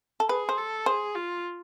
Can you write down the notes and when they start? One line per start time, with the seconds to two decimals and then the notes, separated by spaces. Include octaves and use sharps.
0.20 A4
0.29 G#4 B4
0.49 C5
0.57 A4
0.86 G#4 C5
1.15 F4